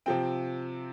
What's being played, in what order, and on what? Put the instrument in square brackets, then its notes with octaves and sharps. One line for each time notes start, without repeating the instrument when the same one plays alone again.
[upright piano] C3 F3 C4 G5